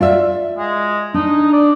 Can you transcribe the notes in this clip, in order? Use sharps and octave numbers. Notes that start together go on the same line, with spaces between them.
F4 D5 E5
G#3
D4 D#4
D5